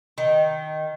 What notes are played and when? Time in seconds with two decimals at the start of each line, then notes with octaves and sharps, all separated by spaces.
0.18 D#3